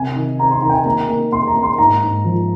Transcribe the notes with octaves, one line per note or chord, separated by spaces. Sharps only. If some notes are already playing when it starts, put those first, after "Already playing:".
Already playing: C3 G#5
D#3
C4 A#5
C6
D#3 A#5
G5
G#5
A#3 A#5
A#3
A#3 C6
A#5
A#3
C6
G#2 A#5
G#2
F3